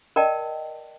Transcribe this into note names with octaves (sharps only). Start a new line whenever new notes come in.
A#4 D5 D#5 G5 A5